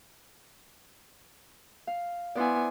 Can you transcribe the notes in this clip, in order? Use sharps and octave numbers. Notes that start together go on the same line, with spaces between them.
F5
B3 E4 C5 D5 G#5